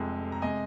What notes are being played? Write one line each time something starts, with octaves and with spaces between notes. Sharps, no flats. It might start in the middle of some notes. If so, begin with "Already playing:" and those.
Already playing: F1 F2 C3 G#3
A#5
C3 G#3 D#5 G#5